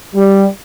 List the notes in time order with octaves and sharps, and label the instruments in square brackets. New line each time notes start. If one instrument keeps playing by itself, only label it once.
[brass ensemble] G3